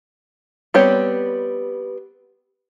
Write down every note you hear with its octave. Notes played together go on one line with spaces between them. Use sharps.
G3 B3 C4 G4 C#5